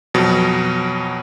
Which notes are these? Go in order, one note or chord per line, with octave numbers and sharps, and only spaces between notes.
F2 B2 F#3